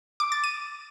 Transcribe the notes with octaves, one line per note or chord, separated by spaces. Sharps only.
D6
A6
D#7